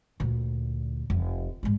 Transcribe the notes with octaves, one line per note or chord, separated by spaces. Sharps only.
D2 A#2
F1
G#2 G3